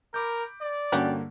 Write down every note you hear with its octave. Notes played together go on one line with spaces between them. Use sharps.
A#4 B5 D6 G6
D5
G2 D3 A#3 C#4 F#4 G4